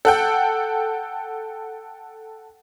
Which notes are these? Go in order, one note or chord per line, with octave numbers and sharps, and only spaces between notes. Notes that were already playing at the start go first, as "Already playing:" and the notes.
A4 F#5 G5